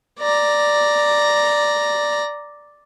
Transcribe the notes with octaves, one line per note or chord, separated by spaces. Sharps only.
D5 A#5